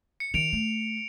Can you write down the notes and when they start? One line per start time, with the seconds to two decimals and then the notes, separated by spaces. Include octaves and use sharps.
0.20 C#7
0.34 D#3 D7 F7
0.53 A3